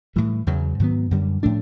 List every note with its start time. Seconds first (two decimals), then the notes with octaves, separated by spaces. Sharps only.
0.16 A2 E3 G3
0.47 E2 C#3 F#3
0.80 G#2 D#3 F#3 B3
1.11 F#2 D3 G3
1.43 A2 F3 A3 D4